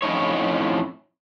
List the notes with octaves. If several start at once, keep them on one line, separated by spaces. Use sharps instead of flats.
F2 A2 C#4 D#4 E4 C#5